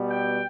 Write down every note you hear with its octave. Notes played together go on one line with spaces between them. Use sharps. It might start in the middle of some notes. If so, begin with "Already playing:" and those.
Already playing: B2 G3 B3
G5